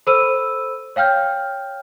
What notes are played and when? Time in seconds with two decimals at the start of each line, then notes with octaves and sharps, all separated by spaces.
0.07 A4 C5 B5 E6 D#7
0.96 C#5 F5 G5 F6 G6